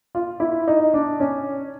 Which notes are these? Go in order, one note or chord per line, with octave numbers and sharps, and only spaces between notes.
F4
E4
D#4
D4
C#4